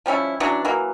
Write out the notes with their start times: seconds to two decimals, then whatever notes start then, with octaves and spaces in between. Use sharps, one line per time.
0.06 F3 G3 C#4 E4
0.40 E3 F#3 C#4 D4
0.65 E3 F#3 A#3